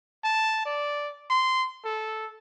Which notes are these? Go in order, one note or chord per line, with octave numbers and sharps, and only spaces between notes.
A5
D5
C6
A4